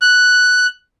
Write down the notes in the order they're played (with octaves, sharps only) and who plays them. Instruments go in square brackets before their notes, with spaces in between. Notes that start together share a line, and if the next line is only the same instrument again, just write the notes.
[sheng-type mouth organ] F#6